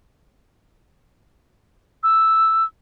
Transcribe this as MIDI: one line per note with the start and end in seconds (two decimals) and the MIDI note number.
2.03 2.64 88